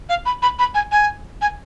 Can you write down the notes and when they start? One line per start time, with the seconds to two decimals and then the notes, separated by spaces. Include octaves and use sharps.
0.09 F5
0.26 B5
0.42 B5
0.59 B5
0.74 G#5
0.92 G#5
1.41 G#5